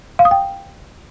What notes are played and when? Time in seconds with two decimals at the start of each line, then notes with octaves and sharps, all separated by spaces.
0.19 F5
0.25 D#6
0.31 G5